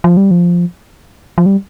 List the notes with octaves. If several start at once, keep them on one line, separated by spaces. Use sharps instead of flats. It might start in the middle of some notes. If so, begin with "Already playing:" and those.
F3
G3
F3
F3
G3